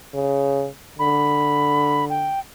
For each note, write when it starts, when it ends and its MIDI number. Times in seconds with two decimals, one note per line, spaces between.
0.14 0.67 49
0.99 2.36 50
0.99 2.05 83
2.09 2.39 79